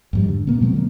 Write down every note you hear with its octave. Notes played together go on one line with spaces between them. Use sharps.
F2 G#2 G3
D3
A#2 A#3 B3
B2 F#3 G#3 C4
D3 A#3 C4